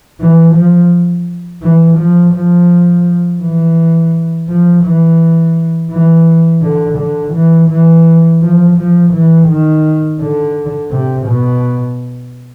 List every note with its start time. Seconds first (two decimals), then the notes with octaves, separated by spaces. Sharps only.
0.20 E3
0.55 F3
1.63 E3
1.98 F3
2.34 F3
3.42 E3
4.48 F3
4.85 E3
5.91 E3
6.62 D3
6.98 D3
7.34 E3
7.70 E3
8.41 F3
8.77 F3
9.13 E3
9.48 D#3
10.20 D3
10.91 C3
11.26 B2